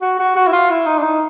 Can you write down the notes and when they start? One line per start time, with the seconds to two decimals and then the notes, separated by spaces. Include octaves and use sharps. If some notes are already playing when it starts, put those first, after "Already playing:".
0.01 F#4
0.19 F#4
0.36 F#4
0.47 E4
0.52 F4
0.70 E4
0.86 D#4
0.98 D4
1.03 D#4